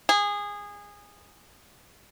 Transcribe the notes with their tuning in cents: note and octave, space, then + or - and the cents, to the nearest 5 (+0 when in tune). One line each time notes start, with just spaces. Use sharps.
G#4 -20